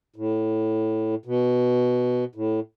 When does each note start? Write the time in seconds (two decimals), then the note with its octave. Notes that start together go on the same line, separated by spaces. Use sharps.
0.16 A2
1.26 B2
2.35 A2